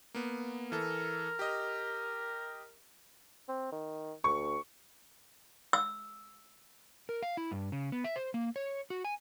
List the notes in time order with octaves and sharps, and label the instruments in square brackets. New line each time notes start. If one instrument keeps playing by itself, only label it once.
[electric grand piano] A#3 B3
[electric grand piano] E3 A4 [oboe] A#4
[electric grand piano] G4 D#5
[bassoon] C4
D#3
[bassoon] D2 [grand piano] C#6
[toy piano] E6
[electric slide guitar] A#4
F5
E4
G2
C#3
B3
E5
C5
A#3
C#5
F#4
G#5